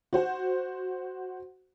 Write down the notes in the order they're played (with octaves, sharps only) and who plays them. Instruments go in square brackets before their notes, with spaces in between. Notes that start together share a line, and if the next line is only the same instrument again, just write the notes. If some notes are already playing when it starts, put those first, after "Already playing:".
[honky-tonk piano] F#4 C5 F#5